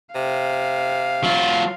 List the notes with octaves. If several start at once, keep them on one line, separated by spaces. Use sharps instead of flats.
C3 F5
F#3 F4